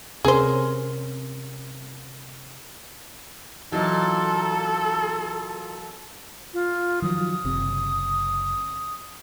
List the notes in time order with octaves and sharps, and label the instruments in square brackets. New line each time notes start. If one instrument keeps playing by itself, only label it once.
[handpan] C3 C#4 A#4 [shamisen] G#4 C5
[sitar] A#2 [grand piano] E3 F#3 D#4 [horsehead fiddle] A4
[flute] F4
[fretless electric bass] D#3 F3 F#3 [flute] D#6
[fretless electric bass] F#1 C3